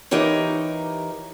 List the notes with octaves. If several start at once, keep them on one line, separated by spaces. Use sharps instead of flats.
E3 D#4 G4 A#4 C#5